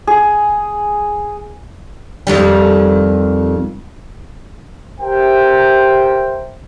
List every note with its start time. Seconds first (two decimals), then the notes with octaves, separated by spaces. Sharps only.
0.07 G#4
2.27 F2 D#3 G3
5.00 G4 A#4 C5 E5 G5